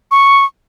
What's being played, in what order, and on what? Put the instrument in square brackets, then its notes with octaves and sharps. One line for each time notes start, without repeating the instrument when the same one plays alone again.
[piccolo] C#6